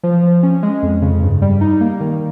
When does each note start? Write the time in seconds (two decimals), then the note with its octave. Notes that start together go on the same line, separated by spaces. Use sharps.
0.03 F3
0.23 F3
0.43 C#4
0.63 G#3
0.82 F2
1.02 C#3
1.22 G2
1.42 G3
1.61 D#4
1.81 A#3
2.00 D#3